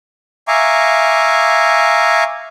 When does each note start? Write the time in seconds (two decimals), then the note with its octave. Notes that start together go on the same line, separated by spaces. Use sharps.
0.48 E5 F5 G#5 A#5 C#6 D6